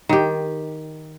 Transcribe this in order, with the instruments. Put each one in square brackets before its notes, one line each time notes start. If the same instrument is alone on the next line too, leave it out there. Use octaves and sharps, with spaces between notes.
[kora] D#3 G4